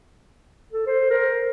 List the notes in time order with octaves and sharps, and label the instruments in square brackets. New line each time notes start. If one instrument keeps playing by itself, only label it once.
[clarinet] A4
C5
A#4